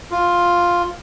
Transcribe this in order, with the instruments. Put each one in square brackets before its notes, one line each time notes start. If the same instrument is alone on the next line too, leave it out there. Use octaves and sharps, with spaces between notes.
[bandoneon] F4